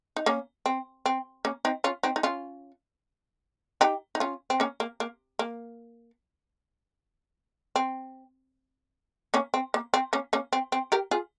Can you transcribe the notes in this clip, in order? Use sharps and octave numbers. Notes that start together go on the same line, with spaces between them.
D#4
A#3 C#4
C4
C4
A#3 C#4
C4 D#4
C#4 F4
C4 D#4
D#4
C#4 F4
D#4 G4
D#4
C#4 F4
C4
A#3 C#4
A#3
A#3
A#3
C4
A#3 C#4
C4
A#3
C4
A#3 C#4
A#3 C#4
C4
C4
G4 A#4
F4 G#4